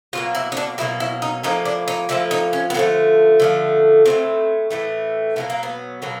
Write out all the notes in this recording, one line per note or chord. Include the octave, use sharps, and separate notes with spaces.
B2 F#3 A#3 F4
E4
D#4
D4
B2 F#3 A#3 E4
E4
D#4
A2 F3 A#3 D#4
D4
D#4
A2 F3 A#3 E4
D#4
C#4
B3
D3 F3 A3 C4
D3 F3 A3
A2 E3 A3 C4
A2 E3 A3
B2 F#3 A#3 B3
A#3
B3
B2 F#3 A#3